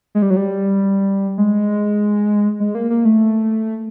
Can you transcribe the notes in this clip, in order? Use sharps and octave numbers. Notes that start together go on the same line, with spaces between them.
G#3
G3
F#3
G3
G#3
G#3
A#3
A#3
A3